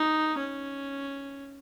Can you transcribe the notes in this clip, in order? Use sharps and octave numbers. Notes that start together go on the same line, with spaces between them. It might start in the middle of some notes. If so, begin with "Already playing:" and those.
Already playing: D#4
C#4